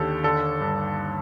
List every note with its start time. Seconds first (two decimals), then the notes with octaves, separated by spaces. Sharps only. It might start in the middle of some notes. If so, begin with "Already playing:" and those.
Already playing: D#2 D3 G4 A4
0.23 D3 A4
0.61 G2